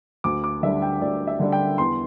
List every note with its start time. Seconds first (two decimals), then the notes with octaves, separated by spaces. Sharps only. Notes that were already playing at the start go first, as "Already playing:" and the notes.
0.24 D2 D6
0.44 D6
0.63 D3 G3 D4 E5
0.82 G5
1.02 D2 D5
1.27 E5
1.40 D3 G3 D4
1.52 G5
1.78 E2 C6